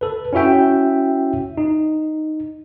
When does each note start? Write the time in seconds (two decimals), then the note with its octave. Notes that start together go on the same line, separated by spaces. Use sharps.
0.01 A4 B4
0.33 C#4 E4 F#4 E5 G5
1.58 D#4